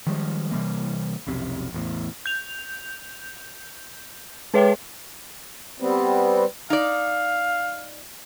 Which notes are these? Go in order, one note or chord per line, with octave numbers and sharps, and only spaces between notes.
D#3 F3 G3 G#3
C3 E3 G3 A#3
B1 F2 C3
A1 E2 A2
G6 F7
G#3 G#4 B4 C#5 E5 G5
G3 B3 C4
D#4 D5 F5